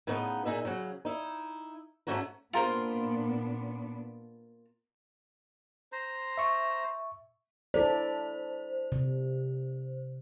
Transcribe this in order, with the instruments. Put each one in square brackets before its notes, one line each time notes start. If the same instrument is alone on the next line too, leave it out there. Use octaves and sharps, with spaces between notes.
[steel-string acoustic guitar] A2 C#3 B3 D#4
A#2 D#4 G#4 E5
C#3 F#3
D#4 E4
G#2 A3 C#4 F#4 A#5
[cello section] A#2 B3 D4 [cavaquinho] F4 A#4 C5
[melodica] C5 A#5
[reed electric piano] E5 C#6
[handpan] E4 A4 D5 [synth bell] C5
[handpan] C3